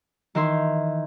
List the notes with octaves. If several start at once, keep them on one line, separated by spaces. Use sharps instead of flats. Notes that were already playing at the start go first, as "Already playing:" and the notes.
D#3 E3 A#4 E5 C6